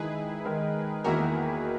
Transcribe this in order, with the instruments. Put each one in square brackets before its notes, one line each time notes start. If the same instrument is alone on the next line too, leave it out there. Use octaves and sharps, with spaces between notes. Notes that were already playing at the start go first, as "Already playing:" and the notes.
Already playing: [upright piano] D#3 G#3 D#4 [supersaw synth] E4 G#4 B4
[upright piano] D#3 G#3 D#4 A#4
[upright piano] E2 D#3 A#3 E4 [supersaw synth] F#4 A#4